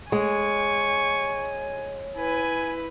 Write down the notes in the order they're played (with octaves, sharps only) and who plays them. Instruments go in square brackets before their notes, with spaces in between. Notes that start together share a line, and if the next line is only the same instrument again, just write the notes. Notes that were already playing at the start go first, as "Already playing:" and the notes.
[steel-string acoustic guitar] G#3 [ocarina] C#5 [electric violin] G#5 [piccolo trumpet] C#6
[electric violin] E4 B4 [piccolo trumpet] G#5